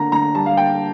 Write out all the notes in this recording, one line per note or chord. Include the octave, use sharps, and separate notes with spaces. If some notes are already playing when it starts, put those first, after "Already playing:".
Already playing: D3 A#3 A#5
D3 A#5
G3 A5
F5
A#3 G5